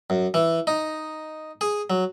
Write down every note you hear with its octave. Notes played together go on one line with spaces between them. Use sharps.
F#2
E3
D#4
G#4
F#3